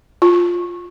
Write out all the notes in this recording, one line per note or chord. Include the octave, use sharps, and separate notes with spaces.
F4